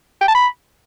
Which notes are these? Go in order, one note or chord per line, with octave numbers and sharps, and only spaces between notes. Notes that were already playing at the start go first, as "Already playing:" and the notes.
G5
A5
B5